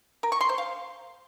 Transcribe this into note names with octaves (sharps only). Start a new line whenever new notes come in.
A#4
C#6
C6
C5
F5